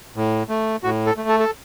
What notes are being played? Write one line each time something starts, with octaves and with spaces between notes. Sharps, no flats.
A2
A3
A2 F#4
A4
A3
A4
A4